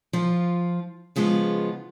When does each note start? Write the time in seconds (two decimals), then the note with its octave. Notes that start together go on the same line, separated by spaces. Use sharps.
0.13 F3 F4
1.16 C#3 F3 G#3 B3 F4